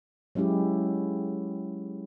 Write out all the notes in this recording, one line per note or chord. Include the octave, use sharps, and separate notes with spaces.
F#3 G#3 C#4 E4 G4